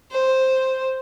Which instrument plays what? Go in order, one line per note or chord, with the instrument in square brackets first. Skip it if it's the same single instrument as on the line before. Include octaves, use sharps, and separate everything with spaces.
[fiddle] C5